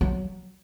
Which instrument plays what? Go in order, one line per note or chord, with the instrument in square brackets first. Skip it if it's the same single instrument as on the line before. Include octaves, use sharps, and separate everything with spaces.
[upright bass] F#3